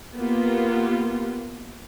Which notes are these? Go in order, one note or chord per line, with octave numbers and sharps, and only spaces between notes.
A#3 B3 F4 G4